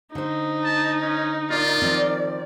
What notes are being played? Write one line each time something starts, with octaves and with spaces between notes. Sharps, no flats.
D3 D#4 C5
A5
C#4
F4 A#4 D5
D#3 F3 C4